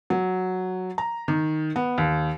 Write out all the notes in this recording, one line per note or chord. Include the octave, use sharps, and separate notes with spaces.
F#3
A#5
D#3
B3
D#2